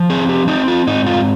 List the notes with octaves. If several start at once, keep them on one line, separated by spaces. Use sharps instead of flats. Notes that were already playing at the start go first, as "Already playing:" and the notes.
Already playing: F3
C4 G#4
G4
C4 D#4
F4
G#2 D#4
F4